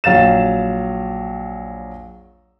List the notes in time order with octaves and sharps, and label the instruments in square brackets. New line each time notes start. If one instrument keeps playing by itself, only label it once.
[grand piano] A#1 F#3 F5 A6 E7